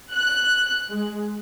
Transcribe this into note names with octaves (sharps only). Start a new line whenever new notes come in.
F#6
G#3